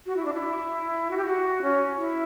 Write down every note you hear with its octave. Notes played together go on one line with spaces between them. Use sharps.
F#4
E4
D4
E4
F#4
G4
F#4
C#4
E4